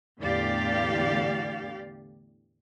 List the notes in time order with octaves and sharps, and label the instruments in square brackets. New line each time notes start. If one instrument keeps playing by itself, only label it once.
[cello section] E2 A2 D3 G4 D5 F5